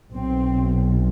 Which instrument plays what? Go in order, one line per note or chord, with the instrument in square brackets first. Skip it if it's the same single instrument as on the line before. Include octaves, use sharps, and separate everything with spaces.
[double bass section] B1 B2 C4